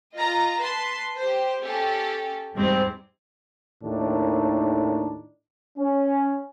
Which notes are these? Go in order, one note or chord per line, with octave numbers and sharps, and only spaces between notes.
F4 D#5 A#5
B4 A5 C6
G4 C5
C#4 G4 A4
E2 G#2 G3 C4
D#2 A2 D#3 D4 D#4
C#4